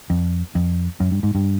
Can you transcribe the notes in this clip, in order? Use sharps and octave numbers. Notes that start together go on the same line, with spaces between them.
F2
F2
F#2
G2
G#2
G2